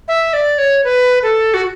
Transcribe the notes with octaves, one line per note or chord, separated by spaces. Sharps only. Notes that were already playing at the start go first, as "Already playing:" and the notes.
E5
D5
C#5
B4
A4
F#4